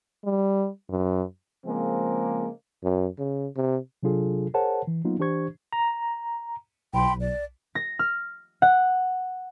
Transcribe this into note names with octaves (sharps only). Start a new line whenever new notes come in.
G3
F#2
C#3 F3 G#3 A#3 C4
F#2
C#3
C3
C3 F#3 D4 F4 G#4 A4
G#4 A#4 C5 C#5 F#5 A5
E3
F#3 A#3 B3 D#4 F4
E3 D4 G4 C5 C#6 G#6
A#5
B1 G5 B5 C6
D5
A#6
F6
F#5